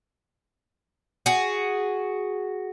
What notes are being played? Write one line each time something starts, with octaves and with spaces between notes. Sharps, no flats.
F#4 G#4